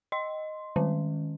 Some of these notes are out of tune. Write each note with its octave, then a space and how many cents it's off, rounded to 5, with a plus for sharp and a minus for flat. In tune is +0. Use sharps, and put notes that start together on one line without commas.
D#5 +0 C6 +0
D#3 +0 G#3 +0 C#4 +0